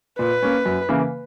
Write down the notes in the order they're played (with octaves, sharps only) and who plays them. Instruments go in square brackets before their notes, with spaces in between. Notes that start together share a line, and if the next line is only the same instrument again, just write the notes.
[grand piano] A#2 [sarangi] B4
[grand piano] A#3 C#4
F#2
C#3 E3 A#3